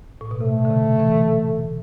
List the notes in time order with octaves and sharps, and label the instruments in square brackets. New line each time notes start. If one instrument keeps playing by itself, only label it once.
[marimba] A2
B2
[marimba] C3 [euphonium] A3
[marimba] D3
C3
E3